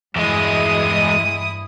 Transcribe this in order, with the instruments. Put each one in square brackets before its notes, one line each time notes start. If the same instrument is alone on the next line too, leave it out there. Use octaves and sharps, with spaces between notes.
[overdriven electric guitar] E2 G#3 [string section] G2 E4 D#6